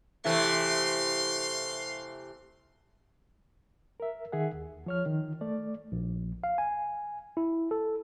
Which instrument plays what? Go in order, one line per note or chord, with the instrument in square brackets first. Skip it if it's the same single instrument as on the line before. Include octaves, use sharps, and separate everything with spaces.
[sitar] C3 E3 A3 [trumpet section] F5 C6
[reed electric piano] A#4 E5
D#3 G#4 E5 F#5
D#2
F3 C#5 F6
D#3
A3 D5
[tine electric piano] A#1
F5
G#5
E4
A4